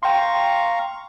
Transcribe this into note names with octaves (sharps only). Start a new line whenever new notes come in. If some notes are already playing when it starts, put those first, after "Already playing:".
F5 G5 A#5 C6 C#6